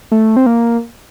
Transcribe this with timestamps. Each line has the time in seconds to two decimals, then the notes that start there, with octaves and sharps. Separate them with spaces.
0.12 A3
0.36 C4
0.46 A#3